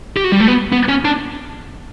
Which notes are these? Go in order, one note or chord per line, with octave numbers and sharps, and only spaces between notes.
G4
F#4
G3
A3
B3
B3
C#4
D4